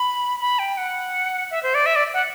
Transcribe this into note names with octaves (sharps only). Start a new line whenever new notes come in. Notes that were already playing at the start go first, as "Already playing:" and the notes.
Already playing: B5
B5
G5
F#5
E5
C5
D5
E5
D5
F#5